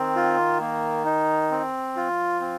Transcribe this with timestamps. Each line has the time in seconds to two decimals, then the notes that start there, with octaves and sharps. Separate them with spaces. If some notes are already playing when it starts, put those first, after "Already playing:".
Already playing: D#3 C4
0.16 F4
0.60 A#3
1.05 D#4
1.51 C4
1.95 F3 F4
2.41 C4